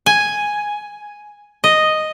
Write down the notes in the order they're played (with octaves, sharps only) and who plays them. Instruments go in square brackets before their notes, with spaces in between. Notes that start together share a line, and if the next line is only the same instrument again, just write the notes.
[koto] G#5
D#5